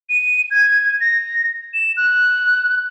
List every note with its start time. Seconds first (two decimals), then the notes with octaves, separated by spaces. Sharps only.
0.09 D#7
0.51 G#6
1.01 A#6
1.74 E7
1.97 F#6